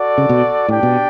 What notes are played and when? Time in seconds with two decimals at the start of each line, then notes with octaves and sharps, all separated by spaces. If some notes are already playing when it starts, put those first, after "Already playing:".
Already playing: F#4 A4 D5
0.18 C#3
0.29 B2
0.68 A2 D4 G4 D5 G5
0.83 B2